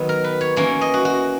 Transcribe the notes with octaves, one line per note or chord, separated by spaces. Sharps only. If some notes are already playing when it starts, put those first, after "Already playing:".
Already playing: D#3 F#3 B3
A#4
B4
C#5
E3 A#3 C#4 C#5
D#5
F#4
F#4